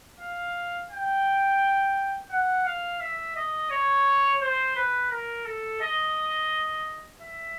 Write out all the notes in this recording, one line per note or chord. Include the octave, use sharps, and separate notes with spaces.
F5
G5
F#5
F5
E5
D#5
C#5
C5
B4
A#4
A4
D#5
E5